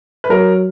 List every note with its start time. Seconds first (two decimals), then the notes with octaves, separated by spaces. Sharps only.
0.24 B4
0.30 F#3 A#4